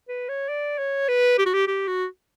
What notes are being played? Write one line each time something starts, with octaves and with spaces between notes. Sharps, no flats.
B4
C#5
D5
C#5
B4
G4
F#4
G4
G4
F#4